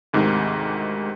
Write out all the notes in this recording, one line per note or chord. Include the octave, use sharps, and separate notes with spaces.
D2 G#2 C3 D#3